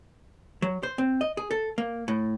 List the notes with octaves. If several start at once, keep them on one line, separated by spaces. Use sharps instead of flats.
F#3
C5
C4
D#5
G#4
A4
A#3
A2